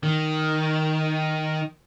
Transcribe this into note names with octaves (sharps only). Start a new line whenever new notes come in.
D#3